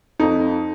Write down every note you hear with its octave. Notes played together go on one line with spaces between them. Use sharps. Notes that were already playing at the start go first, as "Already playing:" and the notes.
F2 D#4